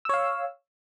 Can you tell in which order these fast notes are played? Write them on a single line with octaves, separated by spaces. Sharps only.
E6 C#5 F5